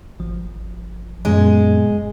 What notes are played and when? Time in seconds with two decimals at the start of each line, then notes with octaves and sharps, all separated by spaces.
0.20 G#1 F3
1.25 F#2 A#2 G#3 B3